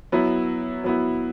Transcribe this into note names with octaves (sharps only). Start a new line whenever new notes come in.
F#3 B3 E4
F#3 B3 E4